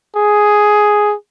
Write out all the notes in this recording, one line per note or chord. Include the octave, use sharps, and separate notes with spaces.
G#4